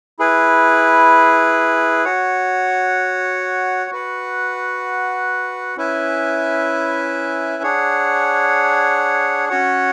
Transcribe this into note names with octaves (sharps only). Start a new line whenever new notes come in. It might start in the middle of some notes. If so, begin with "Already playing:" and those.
E4 G#4 B4
F#4 C#5 F#5
F#4 B4 F#5
C#4 E4 B4 E5 G#5
D4 G#4 C#5 F#5
C#4 F#4 C#5 F#5